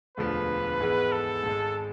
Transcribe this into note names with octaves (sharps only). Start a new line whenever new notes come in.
E1 D2 D3 F3 B4
G#2 E3 G#3 B3
A4
G#1 G#2 G#3